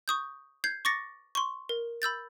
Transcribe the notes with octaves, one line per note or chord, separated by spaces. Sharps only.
C#6 D#6 G6
G6 G#6 C7
C#6 D6 A6 A#6 C#7
C6 C#6
A#4
B5 E6 G6 A6